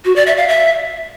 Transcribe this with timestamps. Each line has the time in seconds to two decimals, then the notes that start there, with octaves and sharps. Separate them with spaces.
0.05 F#4
0.16 D5
0.27 E5
0.37 F5
0.48 E5